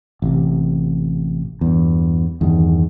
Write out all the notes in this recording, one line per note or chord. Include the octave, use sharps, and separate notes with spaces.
A1 C3
E2 G2
E2 G2 D#3